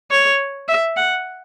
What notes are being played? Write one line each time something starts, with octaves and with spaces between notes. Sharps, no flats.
C#5
E5
F#5